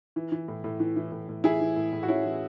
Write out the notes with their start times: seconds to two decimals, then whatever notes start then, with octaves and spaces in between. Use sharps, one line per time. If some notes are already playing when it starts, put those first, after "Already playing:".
0.16 E3
0.32 E3
0.48 A2
0.64 A2
0.80 E3
0.96 E3
1.12 A2
1.29 A2
1.44 E3 E4 G#4
1.61 E3
1.76 A2
1.92 A2
2.03 F#4
2.08 E3 C#4 E4
2.25 E3